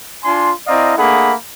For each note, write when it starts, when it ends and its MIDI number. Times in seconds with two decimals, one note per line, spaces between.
0.25 0.51 62
0.25 0.51 65
0.25 0.51 80
0.25 0.51 84
0.68 0.96 60
0.68 0.96 64
0.68 0.96 74
0.68 0.96 75
0.68 0.96 77
0.68 0.96 82
0.98 1.33 57
0.98 1.33 58
0.98 1.33 62
0.98 1.33 68
0.98 1.33 78
0.98 1.33 83